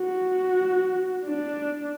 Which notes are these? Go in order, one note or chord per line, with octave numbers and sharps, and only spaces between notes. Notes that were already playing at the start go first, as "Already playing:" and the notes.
Already playing: F#4
D4